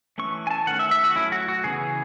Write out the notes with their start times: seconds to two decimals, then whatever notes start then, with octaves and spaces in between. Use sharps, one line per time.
0.18 E3 A3 C#4 C#6
0.47 G#5
0.51 A5
0.67 D#3 A3 C#4 F#5
0.79 E5
0.91 E5
1.04 F#4
1.16 F#3 A3 C#4 E4
1.32 F#4
1.48 F#4
1.64 C#3 E3 B3 G#4